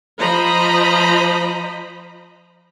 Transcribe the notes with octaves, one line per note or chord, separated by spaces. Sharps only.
F3 C5 D#5 A#5 B5